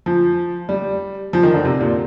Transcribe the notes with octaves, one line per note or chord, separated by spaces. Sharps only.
F3
G3
F3
D#3
D3
C3
A#2